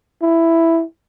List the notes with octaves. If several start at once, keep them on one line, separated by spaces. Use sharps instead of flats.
E4